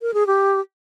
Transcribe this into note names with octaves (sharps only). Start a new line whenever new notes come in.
A#4
G#4
G4